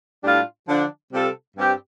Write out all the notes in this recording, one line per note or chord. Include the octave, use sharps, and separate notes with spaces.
A2 G3 D4 F4
D3 F3 D4
C3 G3 F4 A4
G2 G3 C4 G4